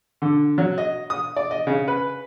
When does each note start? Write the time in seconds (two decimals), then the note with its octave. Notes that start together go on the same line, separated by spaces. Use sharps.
0.22 D3
0.58 F#3
0.78 D#5
1.10 D#6
1.36 D5
1.51 D#5
1.67 C#3
1.88 B4